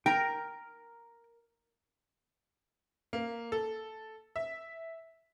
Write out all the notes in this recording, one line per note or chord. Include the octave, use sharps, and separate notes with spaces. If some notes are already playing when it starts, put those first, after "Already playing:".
A#4 G5 A#5
A#3
A4
E5